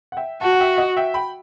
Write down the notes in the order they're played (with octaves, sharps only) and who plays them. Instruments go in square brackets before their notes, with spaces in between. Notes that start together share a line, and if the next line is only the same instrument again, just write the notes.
[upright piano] F#5
E5 G5
[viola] F#4 [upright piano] F#5 A5
[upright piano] F#5
E5 G5
D#5 F#5
E5 G5
G5 B5